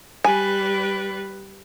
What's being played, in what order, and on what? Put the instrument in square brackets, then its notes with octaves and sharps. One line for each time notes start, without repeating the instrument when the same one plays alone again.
[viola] G3 B4 [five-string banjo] G#5